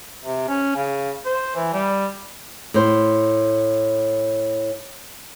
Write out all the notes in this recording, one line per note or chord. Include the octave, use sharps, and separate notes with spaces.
C3
C#4
C#3
C5
E3
G3
A2 C5